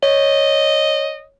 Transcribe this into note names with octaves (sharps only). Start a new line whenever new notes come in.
C#5 D#5